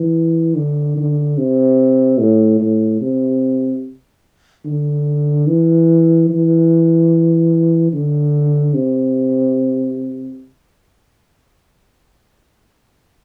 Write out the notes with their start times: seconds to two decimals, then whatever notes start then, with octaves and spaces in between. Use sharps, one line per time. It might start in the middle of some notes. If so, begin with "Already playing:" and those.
Already playing: E3
0.56 D3
0.97 D3
1.38 C3
2.20 A2
2.61 A2
3.01 C3
4.65 D3
5.48 E3
6.30 E3
7.93 D3
8.74 C3